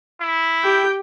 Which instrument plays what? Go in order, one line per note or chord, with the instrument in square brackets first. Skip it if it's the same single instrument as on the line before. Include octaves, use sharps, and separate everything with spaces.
[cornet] E4
[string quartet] G4 G5 G6